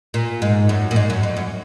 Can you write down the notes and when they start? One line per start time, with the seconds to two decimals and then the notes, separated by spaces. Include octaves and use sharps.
0.14 A#2
0.42 G#2
0.69 F#2
0.91 A#2
0.96 G#2
1.10 F#2
1.23 F2
1.37 F#2